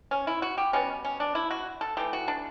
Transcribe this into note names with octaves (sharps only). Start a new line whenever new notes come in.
C#4
E4
F#4
G4
B2 G3 B3 C#4
C#4
D4
E4
F#4
A4
E3 A3 G4
F#4
D4